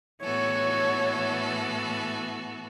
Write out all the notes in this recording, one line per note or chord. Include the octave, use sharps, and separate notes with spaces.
A2 E3 B3 F#4 A4 C#5